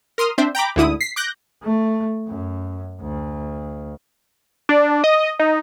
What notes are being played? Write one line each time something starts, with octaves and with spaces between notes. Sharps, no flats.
A#4 C6 D#6 F6
C4 D4 C5 E5
G5 A#5 B5 D6
D2 G#2 D3 E4 D#6
B6 C7
D6 F#6 G6 A#6
A3
F#2
D2
D4
D#5
D#4